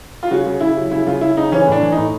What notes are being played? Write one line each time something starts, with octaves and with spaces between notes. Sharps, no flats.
F4
C#3 F#4
C#3
C#3 E4
F#3
C#3 E4
C#3 F4
C#3 E4
C#3 D#4
E3 C#4
A2 D4
E3
A2 D#4